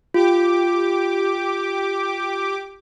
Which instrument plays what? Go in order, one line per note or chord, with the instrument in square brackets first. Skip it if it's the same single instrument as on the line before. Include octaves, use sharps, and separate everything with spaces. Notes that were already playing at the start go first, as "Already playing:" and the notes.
[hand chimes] F4 [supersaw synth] G4 D6